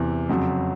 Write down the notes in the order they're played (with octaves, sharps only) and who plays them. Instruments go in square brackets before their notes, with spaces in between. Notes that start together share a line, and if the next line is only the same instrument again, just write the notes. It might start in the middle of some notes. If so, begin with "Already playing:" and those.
Already playing: [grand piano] E2 C3 E3
F2 C#3 F#3